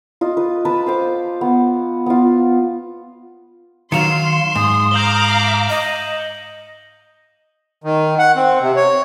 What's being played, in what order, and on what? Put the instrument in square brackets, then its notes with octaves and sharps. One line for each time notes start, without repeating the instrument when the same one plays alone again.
[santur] F4 D#5
B4
B4 A5 B5
C5 F5 D6
B3
B3 F4
[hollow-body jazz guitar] D#3 F#3 [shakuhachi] F5 [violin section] C6 [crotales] C#7 E7 F7
[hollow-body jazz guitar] G#2 [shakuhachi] D#6
[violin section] F5 A#5 D6 [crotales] G6 F#7 G7
[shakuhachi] D#5
[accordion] D#3
F#5
C4
C3
C#5